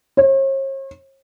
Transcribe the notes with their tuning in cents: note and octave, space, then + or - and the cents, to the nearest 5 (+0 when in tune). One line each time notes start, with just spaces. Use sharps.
C#5 -45